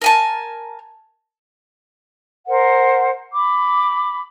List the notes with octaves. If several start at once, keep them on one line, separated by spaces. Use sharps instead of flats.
A#4 G#5 A5
A#4 C5 F#5
B5 D6